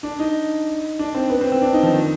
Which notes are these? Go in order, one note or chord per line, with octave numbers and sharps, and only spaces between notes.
D4
D#4
D4
C4
B3
C4
C4
D4
D#4
F3
D#3